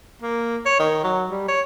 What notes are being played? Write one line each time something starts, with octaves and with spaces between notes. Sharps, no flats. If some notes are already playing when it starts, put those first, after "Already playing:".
A#3
C#5
D#3
F#3
G3
C#5